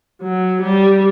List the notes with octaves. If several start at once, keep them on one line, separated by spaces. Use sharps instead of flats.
F#3
G3